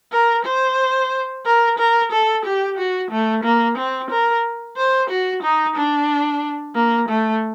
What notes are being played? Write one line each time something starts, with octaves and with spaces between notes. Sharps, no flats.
A#4
C5
A#4
A#4
A4
G4
F#4
A3
A#3
C4
A#4
C5
F#4
D#4
D4
A#3
A3